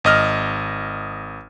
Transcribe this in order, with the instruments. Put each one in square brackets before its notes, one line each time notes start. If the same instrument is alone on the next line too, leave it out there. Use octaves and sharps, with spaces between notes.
[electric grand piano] G#1 D#5 F6